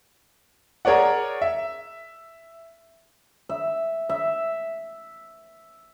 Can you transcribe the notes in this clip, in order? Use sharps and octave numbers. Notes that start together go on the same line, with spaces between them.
G#4 A#4 C#5 D5 F#5
E5
E5
E5